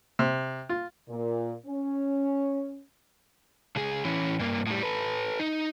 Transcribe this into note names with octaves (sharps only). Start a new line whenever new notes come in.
C3
F4
A#2
C#4
C#2 G#4
E3 C#4
G2 A#3
A2 G3
A4 B4
D#4